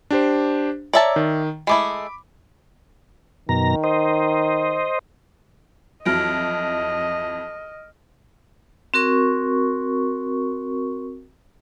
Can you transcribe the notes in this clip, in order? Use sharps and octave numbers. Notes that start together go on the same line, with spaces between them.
D4 G4 C5
C#5 D5 E5 A5 A#5
D#3
G#3 A3 E4 B5 D6
F#2 B2 D#3 A#5
C5 D#5
F2 E3 F#3 D#5 F6 A#6 D7
C4 F#4 A#4 C#6